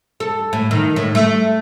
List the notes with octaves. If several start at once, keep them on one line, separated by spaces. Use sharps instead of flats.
A4
A2
D#3
A2
A3